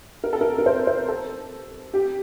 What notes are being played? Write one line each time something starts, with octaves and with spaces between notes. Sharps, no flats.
A#4
A4
A#4
A#4
C5
C5
A4
G4